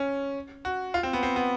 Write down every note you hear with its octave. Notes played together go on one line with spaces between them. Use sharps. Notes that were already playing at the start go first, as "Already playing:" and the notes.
Already playing: C#4
F#4
F4
C4
B3
C4
B3